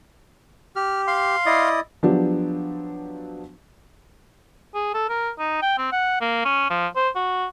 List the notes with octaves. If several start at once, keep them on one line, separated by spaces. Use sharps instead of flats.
G4 F6
F5 C6
E4 D5 D#5
F3 F#3 B3 D4 G4
G#4
A4
A#4
D#4
G5
C4
F#5
A#3
C#4
F3
C5
F#4